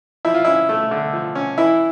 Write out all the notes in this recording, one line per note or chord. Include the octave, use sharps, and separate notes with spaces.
F3 E4
F4
C#4 E4
A3
D3
F3
C#4
E3 E4